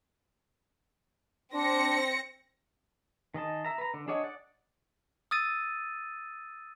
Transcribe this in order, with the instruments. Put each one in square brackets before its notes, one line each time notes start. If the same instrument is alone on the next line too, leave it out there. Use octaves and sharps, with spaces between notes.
[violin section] C4 A#6 C#7 [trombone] D4
[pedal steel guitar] D#3 G#4 D#5 A5
E5 A#5
B4 A#5
D3
D4 G#4 C#5 D#5 F#5
D5 F#5
[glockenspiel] D#6 E6 A6 D#7